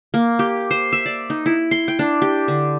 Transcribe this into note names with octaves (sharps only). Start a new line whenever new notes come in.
A#3
G4
C5
E5
D5
D#4
E4
C6
G5
D4
G4
D3